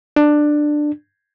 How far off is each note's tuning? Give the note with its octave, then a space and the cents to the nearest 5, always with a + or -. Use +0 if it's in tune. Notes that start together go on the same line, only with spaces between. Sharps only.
D4 +15